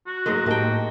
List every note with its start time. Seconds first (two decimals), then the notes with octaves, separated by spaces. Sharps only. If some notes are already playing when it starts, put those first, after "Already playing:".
0.07 F#4
0.26 G#2 F#3 G#3 A#3 A#6
0.46 A2 A#3 G4 D#5 G5 A5